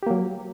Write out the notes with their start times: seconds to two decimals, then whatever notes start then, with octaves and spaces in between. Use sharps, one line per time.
0.03 G4
0.07 A#3
0.11 F#3